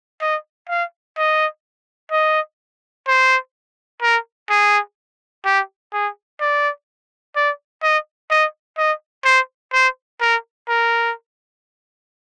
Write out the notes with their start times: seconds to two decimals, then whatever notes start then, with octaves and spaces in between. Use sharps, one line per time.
0.21 D#5
0.69 F5
1.18 D#5
2.12 D#5
3.07 C5
4.02 A#4
4.50 G#4
5.45 G4
5.93 G#4
6.40 D5
7.36 D5
7.83 D#5
8.31 D#5
8.78 D#5
9.25 C5
9.73 C5
10.21 A#4
10.69 A#4